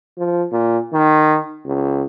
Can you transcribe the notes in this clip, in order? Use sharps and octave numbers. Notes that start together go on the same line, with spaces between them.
F3
A#2
D#3
C#2